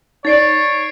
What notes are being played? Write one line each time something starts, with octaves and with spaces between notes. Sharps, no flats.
D#4 C#5 D5 A6 C7 D7